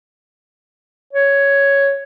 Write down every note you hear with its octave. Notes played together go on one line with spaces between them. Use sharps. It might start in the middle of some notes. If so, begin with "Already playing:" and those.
C#5